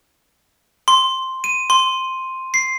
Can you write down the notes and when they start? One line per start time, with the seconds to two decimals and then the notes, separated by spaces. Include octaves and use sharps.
0.88 C6
1.44 D#7
1.70 C6
2.54 C7